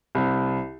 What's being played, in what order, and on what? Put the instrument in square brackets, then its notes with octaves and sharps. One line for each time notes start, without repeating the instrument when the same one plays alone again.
[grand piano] C2